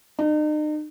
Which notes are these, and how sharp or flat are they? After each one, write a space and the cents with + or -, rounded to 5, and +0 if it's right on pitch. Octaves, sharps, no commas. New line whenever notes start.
D#4 -40